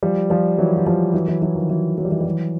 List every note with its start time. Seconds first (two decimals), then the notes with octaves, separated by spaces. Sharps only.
0.03 F3 G3
0.30 F3 G3
0.58 E3 F#3
0.77 F#3
0.87 F3 G3
1.14 E3 F#3
1.28 E3 F#3
1.42 E3 F#3
1.55 D#3 F3
1.70 E3 F#3
1.98 F#3
2.05 G3
2.12 E3 F#3
2.21 G3
2.25 E3 F#3